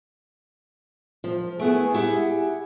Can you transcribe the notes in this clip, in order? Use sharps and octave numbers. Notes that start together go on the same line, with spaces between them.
F3
A3 B3 E4 G#4
E4 G4 F#5